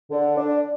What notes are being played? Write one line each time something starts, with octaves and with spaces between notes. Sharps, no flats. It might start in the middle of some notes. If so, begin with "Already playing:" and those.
D3
D4